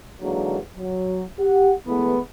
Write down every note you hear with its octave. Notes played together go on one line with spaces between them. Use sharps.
G#2 D3 E3 F#3 G#3 A#3
F#3
G4 F#5
E2 E3 G#3 A3 B3